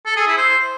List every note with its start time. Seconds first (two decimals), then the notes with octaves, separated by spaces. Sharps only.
0.06 A4
0.16 G#4
0.27 E4
0.37 C5